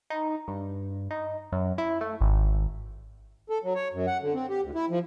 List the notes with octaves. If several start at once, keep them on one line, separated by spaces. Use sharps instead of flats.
D#4
G2
D#4
F#2
E4
A3
G#1
A4
F#3
C#5
F#2
F#5
D3
C4
G4
D2
E4
F3